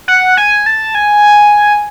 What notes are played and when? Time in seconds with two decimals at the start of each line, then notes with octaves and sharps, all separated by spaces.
0.08 F#5
0.37 G#5
0.66 A5
0.95 G#5